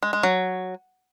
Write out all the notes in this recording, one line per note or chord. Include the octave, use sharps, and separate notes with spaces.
G#3
G#3
F#3